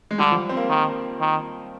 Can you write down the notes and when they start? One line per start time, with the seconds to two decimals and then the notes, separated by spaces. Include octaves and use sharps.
0.11 G#3
0.18 D3 G3
0.32 F3
0.49 C4
0.57 A#3
0.69 D#3
1.21 D#3